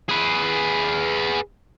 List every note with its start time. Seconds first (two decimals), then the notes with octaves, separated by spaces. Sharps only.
0.09 G#4 B4